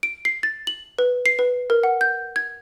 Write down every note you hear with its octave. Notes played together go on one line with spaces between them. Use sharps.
D7
C7
A6
F#7
B4
C7
B4
A#4
F#5
G6
G#6